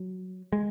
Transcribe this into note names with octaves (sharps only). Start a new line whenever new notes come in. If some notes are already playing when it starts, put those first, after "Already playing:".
Already playing: F#3
G#3